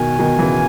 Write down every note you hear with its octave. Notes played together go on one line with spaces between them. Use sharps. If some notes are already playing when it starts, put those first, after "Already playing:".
Already playing: B2 D#3 G#5
B2 D#3
C#3 E3